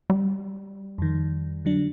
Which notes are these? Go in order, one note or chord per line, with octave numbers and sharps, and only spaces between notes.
G3
F2 D#3
D3 F#3 D4